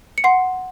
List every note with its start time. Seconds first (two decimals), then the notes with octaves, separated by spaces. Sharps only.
0.18 C#7
0.24 F#5 C6 C7